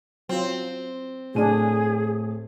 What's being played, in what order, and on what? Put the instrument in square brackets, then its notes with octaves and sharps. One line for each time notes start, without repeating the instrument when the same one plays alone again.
[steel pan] F#3 F4 [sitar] C4
[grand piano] A2 G#5 D#7 [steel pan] F#3 D4 [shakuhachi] G#4